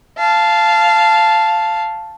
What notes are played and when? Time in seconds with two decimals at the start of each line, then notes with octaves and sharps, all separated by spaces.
0.18 F5 A5